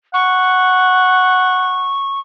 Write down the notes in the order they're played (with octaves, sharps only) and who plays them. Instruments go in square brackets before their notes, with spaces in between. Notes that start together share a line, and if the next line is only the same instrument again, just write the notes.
[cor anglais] F#5 [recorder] C#6